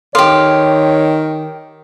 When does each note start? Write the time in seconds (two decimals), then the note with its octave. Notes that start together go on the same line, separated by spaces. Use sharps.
0.15 D#3 G4 A4 C#5 F5 C6